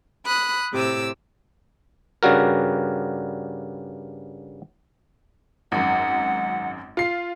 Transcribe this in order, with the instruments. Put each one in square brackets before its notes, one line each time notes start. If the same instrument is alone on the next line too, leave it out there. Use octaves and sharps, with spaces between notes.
[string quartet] B5 D#6 F#6
A2 C3 D6 E6
[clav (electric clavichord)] G2 C#3 G3 F#4 A#4
[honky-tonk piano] G#1 F#2 [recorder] F#5
[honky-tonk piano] F4 C7